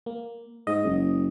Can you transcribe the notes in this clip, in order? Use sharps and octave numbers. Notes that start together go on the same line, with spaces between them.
A#3
G#2 D#5
F#1